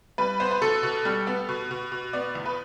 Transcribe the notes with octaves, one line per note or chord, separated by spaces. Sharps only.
G3 B4
B3 C5
B4
B2 A4
B2
G3
B3
B2
B2
B2
B3 D5
E2
B4